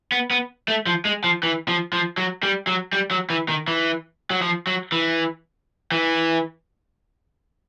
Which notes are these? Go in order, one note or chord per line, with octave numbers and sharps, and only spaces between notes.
B3
B3
A3
F3
G#3
F3
E3
F3
F3
F#3
G3
F#3
G3
F#3
E3
D#3
E3
F#3
F3
F#3
E3
E3